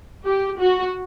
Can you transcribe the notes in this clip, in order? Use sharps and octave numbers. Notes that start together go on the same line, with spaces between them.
G4
F#4